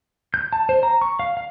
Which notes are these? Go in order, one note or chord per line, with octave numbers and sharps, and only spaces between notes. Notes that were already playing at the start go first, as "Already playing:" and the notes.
G6
A5
C5
A#5
C#6
F5
F5